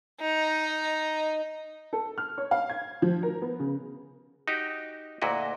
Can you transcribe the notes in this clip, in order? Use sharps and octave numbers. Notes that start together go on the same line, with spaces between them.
D#4
A4
F6
C#5
F5
G#6
F3
A#4
B3
C#3
D#4 F#4 G4
D2 A#2 E4 F#4 D#5